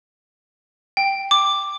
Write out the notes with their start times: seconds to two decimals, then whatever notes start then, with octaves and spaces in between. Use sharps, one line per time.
0.97 G5
1.31 D6